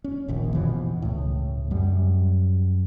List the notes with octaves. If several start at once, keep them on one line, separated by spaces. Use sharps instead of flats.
C#4
D#1 A#1 D#2
G2 B2 E3 F3
C#2 A2
F#2 G3